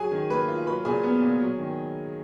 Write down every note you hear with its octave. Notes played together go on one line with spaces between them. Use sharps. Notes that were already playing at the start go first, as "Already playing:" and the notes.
Already playing: F#3 G#4 G#5
D#3
A#3 B4 B5
F4
F#3 B4 B5
A#2 G#4 G#5
B3
A#2
F#3
D#3